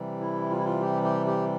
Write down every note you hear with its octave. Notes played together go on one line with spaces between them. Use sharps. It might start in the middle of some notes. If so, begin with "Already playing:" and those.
Already playing: C3 E3 G3
E4
F4
E4
F4
G4
G4
G4